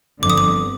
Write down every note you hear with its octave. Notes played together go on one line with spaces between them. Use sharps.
G1 F2 D3 D6
D#6
D6